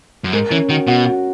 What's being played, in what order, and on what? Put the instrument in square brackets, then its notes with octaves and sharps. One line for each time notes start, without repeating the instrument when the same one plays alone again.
[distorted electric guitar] F#2
[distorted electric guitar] G#2 [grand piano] A#4
[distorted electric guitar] E3 [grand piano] C#4
[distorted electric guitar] D#3 [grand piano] F#4
[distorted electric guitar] B2 [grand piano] F#4
[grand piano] F#4